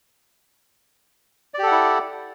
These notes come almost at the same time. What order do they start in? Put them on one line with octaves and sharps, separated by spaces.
D5 G4 A4 F#5 E4